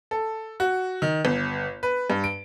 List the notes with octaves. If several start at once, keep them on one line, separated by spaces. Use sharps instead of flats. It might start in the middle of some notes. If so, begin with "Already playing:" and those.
A4
F#4
D#3
G1
B4
G2
D7